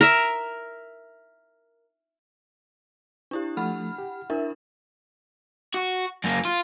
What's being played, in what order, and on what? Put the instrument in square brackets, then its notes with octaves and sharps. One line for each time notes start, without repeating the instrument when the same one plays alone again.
[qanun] A#4 E5
[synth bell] D4 E4 G4
[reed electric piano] F3 A3 [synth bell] F#5 B5 F6
[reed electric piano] G4
[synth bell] D4 E4 A#4 [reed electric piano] E5
[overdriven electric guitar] F#4
F#2 A#3
F4